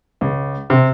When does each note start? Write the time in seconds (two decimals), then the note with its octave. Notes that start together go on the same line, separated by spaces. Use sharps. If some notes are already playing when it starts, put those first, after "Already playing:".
0.21 C#2
0.70 C3